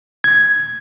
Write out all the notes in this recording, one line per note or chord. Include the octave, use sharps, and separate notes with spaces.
G#6